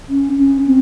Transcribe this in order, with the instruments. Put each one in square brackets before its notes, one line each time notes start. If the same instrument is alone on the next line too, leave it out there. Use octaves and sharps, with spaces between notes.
[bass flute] C#4
C#4
C4